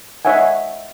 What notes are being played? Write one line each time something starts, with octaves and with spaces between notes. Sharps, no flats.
D#4 C#5 E5 F#5 G#5